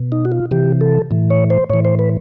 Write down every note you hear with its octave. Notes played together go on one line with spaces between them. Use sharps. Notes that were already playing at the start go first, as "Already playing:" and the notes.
Already playing: B2
D#4
F#4
F4
C3 E3 G4
A4
A2 E3
C#5
C5
A2 E3 C#5
C5
B4